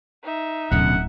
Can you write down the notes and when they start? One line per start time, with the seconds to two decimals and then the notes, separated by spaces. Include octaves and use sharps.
0.23 D#4 E5
0.71 D1 F#2 B2 D3 F#5